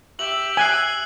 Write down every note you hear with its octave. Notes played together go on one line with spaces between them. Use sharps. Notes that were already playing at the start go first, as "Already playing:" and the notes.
G4 E5 F#7
G#5 E6 F#6 C7